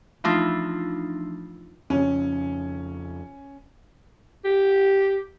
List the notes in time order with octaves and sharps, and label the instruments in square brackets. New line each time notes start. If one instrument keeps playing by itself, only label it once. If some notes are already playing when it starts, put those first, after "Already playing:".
[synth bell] E3 F3 A3 D4 D#4 F4
[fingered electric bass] F2 C#3 [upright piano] C#4
[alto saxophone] G4